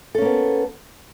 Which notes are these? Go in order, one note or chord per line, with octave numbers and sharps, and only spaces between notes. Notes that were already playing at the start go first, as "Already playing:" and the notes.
A#3 B3 C#4 A4